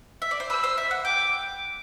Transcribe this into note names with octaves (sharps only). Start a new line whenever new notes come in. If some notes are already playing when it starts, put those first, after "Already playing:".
E5
D5
C5
B4 E6
C5
E5
F#5
G5 D6